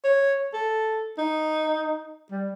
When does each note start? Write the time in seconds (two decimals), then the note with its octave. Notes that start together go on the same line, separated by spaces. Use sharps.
0.04 C#5
0.54 A4
1.18 D#4
2.31 G3